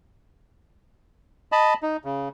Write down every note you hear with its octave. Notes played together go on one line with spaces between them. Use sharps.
D#5 A5 B5
D#4
C#3